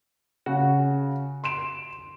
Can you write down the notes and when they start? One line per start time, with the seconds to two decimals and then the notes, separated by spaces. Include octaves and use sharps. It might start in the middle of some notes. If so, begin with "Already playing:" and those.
0.46 C#3 F#4
1.44 C6 D7 E7